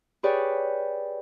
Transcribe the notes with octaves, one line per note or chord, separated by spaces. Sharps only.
G4 G#4 B4 C#5 D5